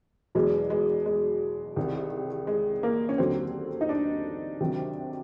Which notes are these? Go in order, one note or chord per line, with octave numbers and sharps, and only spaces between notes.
E2 B2 F#3 G#3
G#3
G#3
C2 C3 D#3
G#3
A#3
C#4
D#2 D3 F#3 C4
D#4
D4
D2 C3 D#3 F#3